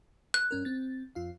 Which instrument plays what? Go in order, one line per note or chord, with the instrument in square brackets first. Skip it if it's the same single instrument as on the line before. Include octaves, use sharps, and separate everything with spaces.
[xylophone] F#6
[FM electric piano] G2 C#4 A#4
C4 A6
F2 F4 F5